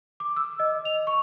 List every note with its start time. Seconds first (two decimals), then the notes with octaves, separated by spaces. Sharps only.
0.20 D6
0.36 E6
0.60 D#5
0.85 F7
1.07 C#6